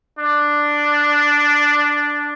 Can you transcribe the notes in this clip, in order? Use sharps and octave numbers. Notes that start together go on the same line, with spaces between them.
D4